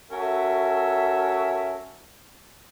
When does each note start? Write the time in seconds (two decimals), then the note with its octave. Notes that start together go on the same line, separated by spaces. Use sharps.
0.11 C#4 F#4 A4 A#4 E5